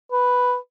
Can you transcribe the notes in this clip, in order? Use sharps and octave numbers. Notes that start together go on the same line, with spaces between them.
B4